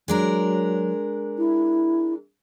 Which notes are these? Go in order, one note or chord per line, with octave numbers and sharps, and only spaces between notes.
F#3 G#3 D4 A#4
E4